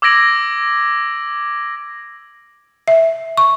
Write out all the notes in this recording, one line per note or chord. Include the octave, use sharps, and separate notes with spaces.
D6 E6 G#6 A#6 D7 F#7
E5
C#6